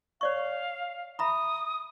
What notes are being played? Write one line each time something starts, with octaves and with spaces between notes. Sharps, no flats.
C#5 D5 F5 C#6
E5 A#5 B5 D#6